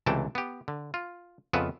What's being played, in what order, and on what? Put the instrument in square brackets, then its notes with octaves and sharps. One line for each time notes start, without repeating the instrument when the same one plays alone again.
[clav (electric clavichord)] C#2 C3 E3 A3 G5 A5
B3 G4
D3
F4
F2 C#3 B3 F4 B4 E5